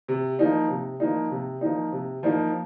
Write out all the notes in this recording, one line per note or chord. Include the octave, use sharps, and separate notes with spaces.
C3
F3 A#3 D#4
C3
F3 A#3 D#4
C3
F3 A#3 D#4
C3
F3 A#3 D#4